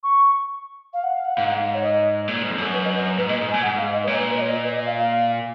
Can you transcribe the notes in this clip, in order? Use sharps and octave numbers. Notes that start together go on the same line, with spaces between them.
C#6
F5
F#5
F5
F#5
G#2 F5
F#5
F5
C#5
D#5
A#2
G#2
F2
F#2
B4
D#5
B4
B4
G#2 B4
A#2 D#5
G#2
G#5
A#2
F#5
G#2
F5
D#5
B4
A#2 C#5
B4
B4
D#5
C#5
D#5
B4
D#5
F5
F5